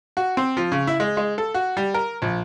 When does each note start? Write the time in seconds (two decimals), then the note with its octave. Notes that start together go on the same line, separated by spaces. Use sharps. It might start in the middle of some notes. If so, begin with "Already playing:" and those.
0.17 F#4
0.37 C4
0.57 F3
0.72 C#3
0.87 E4
1.00 G#3
1.17 G#3
1.38 A4
1.54 F#4
1.77 G3
1.94 A#4
2.22 A#1